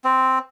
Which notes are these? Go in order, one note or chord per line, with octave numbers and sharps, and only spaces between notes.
C4